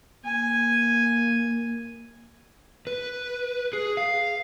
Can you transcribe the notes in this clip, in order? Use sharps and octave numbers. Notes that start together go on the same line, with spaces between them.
A#3 G#5
B4
G#4
F5